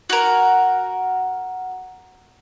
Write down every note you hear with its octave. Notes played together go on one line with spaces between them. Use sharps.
F#4 A#4